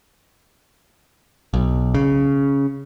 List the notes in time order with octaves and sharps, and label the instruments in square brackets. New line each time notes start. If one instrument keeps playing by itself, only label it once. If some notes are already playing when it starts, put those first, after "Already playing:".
[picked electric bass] B1
C#3